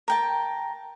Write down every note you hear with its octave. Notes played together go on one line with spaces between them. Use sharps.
A#4 G5 A5